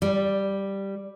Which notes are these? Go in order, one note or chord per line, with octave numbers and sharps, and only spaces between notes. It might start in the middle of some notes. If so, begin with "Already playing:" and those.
G3